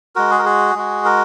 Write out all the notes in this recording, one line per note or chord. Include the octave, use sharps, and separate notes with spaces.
G#3 F#4 A#4
G#4
A#4
G#4
G#3 F#4
A#4